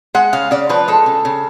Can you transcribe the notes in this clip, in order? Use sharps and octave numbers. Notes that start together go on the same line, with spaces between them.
G#3 F#5
C#3 F5
C#3 D5
F3 B4
G#3 A4
C#3
C#3